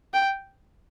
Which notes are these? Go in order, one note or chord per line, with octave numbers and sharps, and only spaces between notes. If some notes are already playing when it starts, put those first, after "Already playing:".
G5